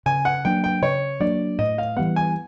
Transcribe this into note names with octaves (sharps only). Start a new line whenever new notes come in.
C#3 G#5
F#5
F#3 A#3 D4 G5
G5
C#3 C#5
F#3 A#3 D4 D5
A2 D#5
F5
E3 G3 B3 F#5
G#5